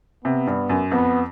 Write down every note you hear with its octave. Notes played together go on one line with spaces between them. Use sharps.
C3 B3
G2
F#2
F2 B3